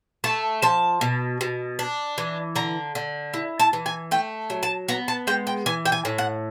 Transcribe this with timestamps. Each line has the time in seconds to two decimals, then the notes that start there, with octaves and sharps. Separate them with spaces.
0.24 A3 A5
0.62 F3 A5
1.01 B2
1.41 B2
1.79 D4
2.18 E3
2.56 D3 A#5
2.95 D3
3.34 E4
3.59 A5
3.73 E3
3.86 G#5
4.11 A3 G5
4.50 F#3
4.63 A5
4.88 B3 A#5
5.08 A5
5.27 G#3 G5
5.47 G5
5.66 E3 G#5
5.85 G5
5.92 G#5
6.05 A2
6.18 F#5